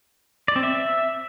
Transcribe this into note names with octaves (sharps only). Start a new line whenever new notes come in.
D5
C4
E5